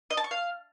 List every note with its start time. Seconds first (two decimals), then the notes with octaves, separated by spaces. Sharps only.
0.10 D#5
0.17 A5
0.24 C#6
0.31 F5